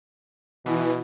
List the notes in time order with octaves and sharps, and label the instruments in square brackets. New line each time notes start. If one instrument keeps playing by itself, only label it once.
[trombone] B2 [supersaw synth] E3